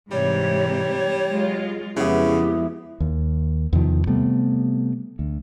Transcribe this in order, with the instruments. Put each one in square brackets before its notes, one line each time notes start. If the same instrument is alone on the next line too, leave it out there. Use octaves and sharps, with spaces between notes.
[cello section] G#2 C3 E3 [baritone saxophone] G3 [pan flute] C#5
[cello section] F#3 G#3 F4
[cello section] F2 F3 G#3 [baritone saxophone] C#3 [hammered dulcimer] B3 E4 [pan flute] G4
[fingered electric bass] D#2
E2 C3 D#3 F3
C3 G3 A3 B3
D2